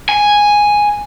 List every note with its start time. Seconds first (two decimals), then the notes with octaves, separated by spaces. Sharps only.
0.09 G#5